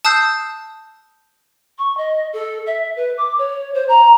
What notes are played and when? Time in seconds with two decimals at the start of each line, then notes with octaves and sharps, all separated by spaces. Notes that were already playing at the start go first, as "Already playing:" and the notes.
0.05 A5 D#6 E6 F#6 G6 C7
1.79 C#6
1.97 D#5
2.33 A4
2.66 E5
2.96 B4
3.18 D6
3.38 C#5
3.74 C5
3.89 A#5